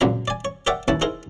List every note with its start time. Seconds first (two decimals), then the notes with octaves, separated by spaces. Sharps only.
0.01 C#2 F#2 A#2 A#3 C4 A#5
0.28 D5 G#5
0.45 C#5
0.67 A#4 C#5 D5 E5 F#5 G5
0.88 D#2 C#4 E4 B4 A5
1.01 D#4 E4 G#4 A#4 C5